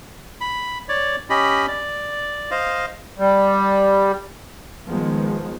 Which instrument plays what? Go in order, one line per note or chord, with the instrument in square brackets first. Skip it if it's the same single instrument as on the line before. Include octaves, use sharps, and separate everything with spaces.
[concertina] B5
C#5 D5
C#4 G4 D#5 B5
D5
C5 D#5 F5
[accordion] G3
[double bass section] D#3 F3 G#3 B3